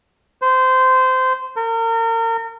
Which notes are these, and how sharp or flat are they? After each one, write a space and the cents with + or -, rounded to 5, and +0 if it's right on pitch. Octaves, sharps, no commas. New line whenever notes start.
C5 -20
A#4 -35